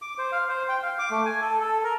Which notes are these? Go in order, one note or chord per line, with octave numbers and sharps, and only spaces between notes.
D6
C5
F5
C5
G5
F5
D6
A3
G#5
A4
A4
A#4